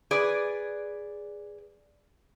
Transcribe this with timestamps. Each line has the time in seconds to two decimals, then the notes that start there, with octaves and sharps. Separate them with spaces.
0.11 G#4 B4 D5